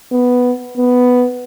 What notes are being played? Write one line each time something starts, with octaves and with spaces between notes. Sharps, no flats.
B3
B3